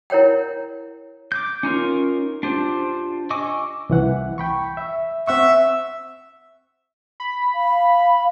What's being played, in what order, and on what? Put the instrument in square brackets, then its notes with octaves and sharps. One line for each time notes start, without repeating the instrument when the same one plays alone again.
[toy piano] E4 A#4 C#5 F#5 G5
[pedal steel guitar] D6 G6
C#4 D#4 F4 A#4
D4 F4 G4 C5
D#5 G#5 C#6 D6 E6
[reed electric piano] C2 E3 F#5
G5 B5 C#6
E5
[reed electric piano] C4 F#5 C#6 [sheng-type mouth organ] E5
[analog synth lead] B5
[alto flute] F5